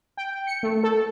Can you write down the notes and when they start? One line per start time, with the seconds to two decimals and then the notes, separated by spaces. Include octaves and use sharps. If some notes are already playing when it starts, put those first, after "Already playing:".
0.17 G5
0.47 C#7
0.63 A3
0.84 A4